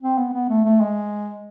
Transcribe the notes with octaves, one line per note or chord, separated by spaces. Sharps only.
C4
B3
B3
A3
A3
G#3